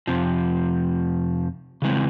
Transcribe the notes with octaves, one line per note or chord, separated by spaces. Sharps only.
F2 C3 F3
C#3 E3 G#3 C4